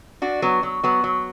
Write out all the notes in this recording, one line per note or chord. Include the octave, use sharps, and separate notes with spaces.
D4 F#4
F#3 B3
F#3
F#3 B3
F#3